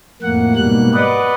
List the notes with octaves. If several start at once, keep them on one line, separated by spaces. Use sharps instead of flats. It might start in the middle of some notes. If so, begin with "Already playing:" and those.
F2 A2 A#3 F#5
G#2 B2 G3 A#3 F#6
B4 D5 D#5 F#5